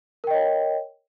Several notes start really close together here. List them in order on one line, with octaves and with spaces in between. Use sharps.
A#4 G5 D#5 C#5